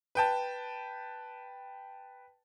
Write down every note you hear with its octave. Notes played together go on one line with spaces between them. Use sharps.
B4 G5 A5